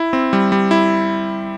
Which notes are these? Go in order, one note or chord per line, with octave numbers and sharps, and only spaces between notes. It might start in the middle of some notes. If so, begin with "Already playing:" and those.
Already playing: E4
C4
G3
G3
E4